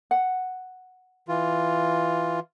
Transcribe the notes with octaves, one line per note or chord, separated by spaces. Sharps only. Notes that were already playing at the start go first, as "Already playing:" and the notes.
F#5
E3 F4